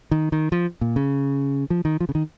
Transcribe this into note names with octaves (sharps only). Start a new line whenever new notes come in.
D#3
D#3
F3
A#2
C#3
F3
D#3
F3
C#3
D#3